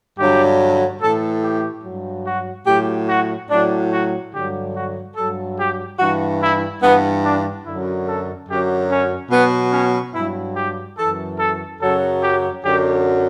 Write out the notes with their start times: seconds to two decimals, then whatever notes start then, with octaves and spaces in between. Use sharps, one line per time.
0.17 G2 D3 F#3 G4
1.00 A2 E3 A4
1.42 G4
1.83 G2 F#3
2.25 F#4
2.66 A2 F#3 G4
3.08 F#4
3.49 A2 F#3 D4
3.92 F#4
4.33 G2 D3 F#3 G4
4.74 F#4
5.16 G2 F#3 A4
5.58 G4
5.99 G2 E3 F#4
6.41 E4
6.82 G2 E3 B3
7.24 D4
7.65 F#2 D3 F#3 E4
8.07 A4
8.48 F#2 D3 F#3 G4
8.90 C#4
9.31 B2 F#3 B3
9.73 C#4
10.14 G2 F#3 E4
10.56 G4
10.98 F#2 E3 A4
11.39 A4
11.81 F#2 C#3 F#3 A4
12.22 G4
12.64 F#2 D3 F#3 G4